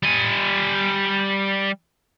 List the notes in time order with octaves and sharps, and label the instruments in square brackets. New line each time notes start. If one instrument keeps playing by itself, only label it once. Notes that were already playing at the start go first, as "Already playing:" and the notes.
[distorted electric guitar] G3 G#5